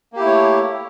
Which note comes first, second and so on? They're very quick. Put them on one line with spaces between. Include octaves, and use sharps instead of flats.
A#3 G4 E4 A3 C#5